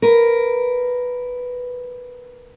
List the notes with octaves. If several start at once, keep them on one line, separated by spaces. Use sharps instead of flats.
A#4 B4